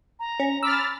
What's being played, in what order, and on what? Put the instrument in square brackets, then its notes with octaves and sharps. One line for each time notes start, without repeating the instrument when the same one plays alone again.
[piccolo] A#5
[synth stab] C#4
[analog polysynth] B5 F6 A6 [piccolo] D6 [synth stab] E6